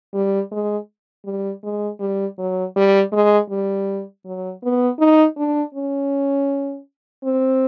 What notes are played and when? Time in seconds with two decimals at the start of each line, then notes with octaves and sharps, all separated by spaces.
0.14 G3
0.52 G#3
1.26 G3
1.64 G#3
2.00 G3
2.39 F#3
2.76 G3
3.12 G#3
3.50 G3
4.25 F#3
4.63 B3
4.99 D#4
5.37 D4
5.75 C#4
7.25 C4